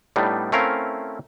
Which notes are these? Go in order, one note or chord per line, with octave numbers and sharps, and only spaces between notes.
A2 G3 B3 D4 D#4
A3 C4 C#4 E4 A#4 F5